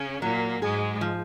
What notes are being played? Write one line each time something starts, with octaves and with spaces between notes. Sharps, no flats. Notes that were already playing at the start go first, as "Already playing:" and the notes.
Already playing: C#3 C#4
A#2 F#3 A#3
G#2 G#3 G#4
F3